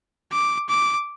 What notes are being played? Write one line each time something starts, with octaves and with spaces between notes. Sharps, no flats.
D6
D6